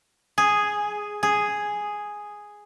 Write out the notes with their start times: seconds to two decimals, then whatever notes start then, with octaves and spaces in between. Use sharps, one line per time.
0.38 G#4
1.23 G#4